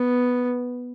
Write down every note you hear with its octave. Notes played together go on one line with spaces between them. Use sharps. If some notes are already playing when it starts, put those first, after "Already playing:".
Already playing: B3